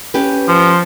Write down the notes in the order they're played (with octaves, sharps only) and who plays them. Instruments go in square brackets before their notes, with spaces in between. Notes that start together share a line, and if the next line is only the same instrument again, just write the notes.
[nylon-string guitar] C#4 G4 B4
[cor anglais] F3